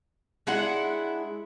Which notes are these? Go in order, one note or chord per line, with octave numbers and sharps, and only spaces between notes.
G#3 D4 E4 F#5